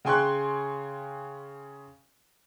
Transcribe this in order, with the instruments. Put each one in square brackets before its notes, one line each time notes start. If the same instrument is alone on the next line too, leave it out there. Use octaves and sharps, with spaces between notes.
[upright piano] C#3 G5 G#5 C6 C#6 F#6